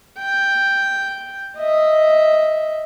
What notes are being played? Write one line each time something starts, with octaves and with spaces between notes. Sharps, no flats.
G5
D#5 E5